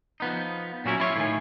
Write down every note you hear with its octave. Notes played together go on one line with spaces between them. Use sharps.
F3 B3 D#4
A#2 F#3 C#4 E4
E4 F4 C#5
A2 D#3 G#5